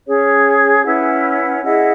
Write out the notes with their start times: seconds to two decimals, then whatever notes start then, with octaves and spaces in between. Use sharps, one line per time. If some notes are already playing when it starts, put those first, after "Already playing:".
0.07 C#4 G#4 C#5
0.86 C#4 E4 B4 F#5
1.64 E4 G#4 D#5 F#5